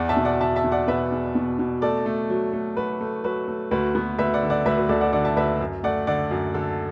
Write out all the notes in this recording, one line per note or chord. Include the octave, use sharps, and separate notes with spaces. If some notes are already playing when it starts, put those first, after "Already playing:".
Already playing: E2 D5 F#5
E5 A5
B2
D5 F#5
B2 E5 A5
E5 A5
E2
D5 F#5
B2 B4 E5
E2
B2
B2
A3 A4 D5
A3
F#3
A3
F#3 F#4 B4
A3
F#3 F#4 B4
A3
D2 F#4 B4
B3
D2 B4 E5
D5 F#5
D3
D5 F#5
D2 B4 E5
F#4 B4
D2 A4 D5
D5 F#5
D3 D5 F#5
E5 A5
D2 B4 E5
F#2
A3 D5 F#5
D3 D5 F#5
F#2
D3 A4